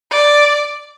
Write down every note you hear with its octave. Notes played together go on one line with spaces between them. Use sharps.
D5